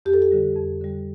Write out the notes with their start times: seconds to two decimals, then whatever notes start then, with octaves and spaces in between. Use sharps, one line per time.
0.06 F2 G4
0.13 A4
0.22 G4
0.32 D3 G3
0.56 F2
0.81 D3 G3